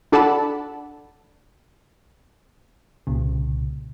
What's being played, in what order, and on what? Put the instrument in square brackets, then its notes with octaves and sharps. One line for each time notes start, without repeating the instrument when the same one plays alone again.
[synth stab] D4 A4 D5 F#5 A5 B5
[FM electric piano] C2 A#2 C#3